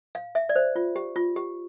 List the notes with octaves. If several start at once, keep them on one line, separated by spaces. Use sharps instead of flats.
F5
E5
D5
C5
F4
G4
F4
G4